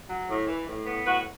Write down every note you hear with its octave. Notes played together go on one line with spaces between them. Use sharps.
F#3
A2
E3
A2
B3
A2 F#4 B4